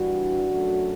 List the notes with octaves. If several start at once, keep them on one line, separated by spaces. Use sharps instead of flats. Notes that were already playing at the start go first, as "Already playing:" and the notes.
Already playing: G2 E3 G3 D4 F#4
F#2 F#3 A3